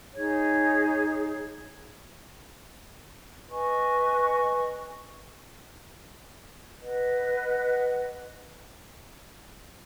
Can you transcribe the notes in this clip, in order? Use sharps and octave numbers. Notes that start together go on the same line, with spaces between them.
D#4 G#4 C#5
B4 D#5 G#5 C#6
B4 D#5 F#5